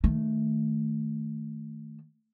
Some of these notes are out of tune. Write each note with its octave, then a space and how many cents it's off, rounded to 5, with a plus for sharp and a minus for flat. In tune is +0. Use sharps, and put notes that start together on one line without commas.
D#3 -10 A3 +0